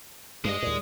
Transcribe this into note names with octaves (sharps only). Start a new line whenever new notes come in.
G2 G#3 D#5
D#2 A#2